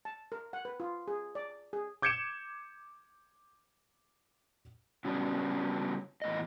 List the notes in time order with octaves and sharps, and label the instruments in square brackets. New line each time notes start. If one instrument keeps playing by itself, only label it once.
[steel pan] A5
A#4
F#5
B4
F4
G#4
D5
G#4
[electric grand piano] D6 G6 G#6 C#7 D7 E7
[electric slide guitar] C#3 F#3 G3 B3 C#4 D4
E2 A2 D#5